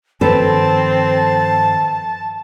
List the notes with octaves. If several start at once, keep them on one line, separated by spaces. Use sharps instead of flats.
G2 D#3 F3 C4 A4 B4 A5